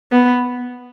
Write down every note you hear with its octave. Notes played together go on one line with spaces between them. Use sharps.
B3